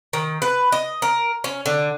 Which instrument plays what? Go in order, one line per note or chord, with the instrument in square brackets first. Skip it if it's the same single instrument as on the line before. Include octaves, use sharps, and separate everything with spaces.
[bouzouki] D#3
B4
D#5
A#4
C#4
D3